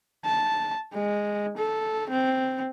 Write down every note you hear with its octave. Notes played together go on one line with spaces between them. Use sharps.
A5
G#3
A4
C4